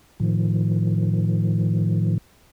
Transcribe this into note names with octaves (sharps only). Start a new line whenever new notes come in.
A2 D#3 F3